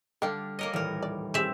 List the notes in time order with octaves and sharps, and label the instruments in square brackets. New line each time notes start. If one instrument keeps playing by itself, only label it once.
[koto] D3 D4 [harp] G3 F6 [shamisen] A4 F5 G5
[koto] A#3 A#4 D#5 [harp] C#5 D6
[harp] D#1 E3 G3 [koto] A2 A#4 [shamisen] D5
[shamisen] D5
[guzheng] C4 E5 [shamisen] G4 G#4